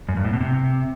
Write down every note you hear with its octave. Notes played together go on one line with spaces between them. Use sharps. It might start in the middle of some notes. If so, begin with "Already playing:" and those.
F#2
G2
A2
B2
C3